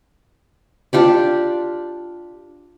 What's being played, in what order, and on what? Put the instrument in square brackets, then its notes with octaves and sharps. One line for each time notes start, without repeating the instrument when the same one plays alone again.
[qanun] D4 F4 G4 D5